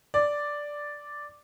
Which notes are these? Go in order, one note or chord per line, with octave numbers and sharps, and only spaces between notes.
D5